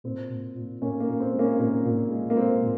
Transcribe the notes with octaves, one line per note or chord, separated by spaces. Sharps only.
A#2 C4
A#2
A#2
A#2 A#3 C#4
A#3
A#2
C4
G#3
A#3 C#4
A#2 A#3
A#2
G#3
A#3
G#3 C4
A#2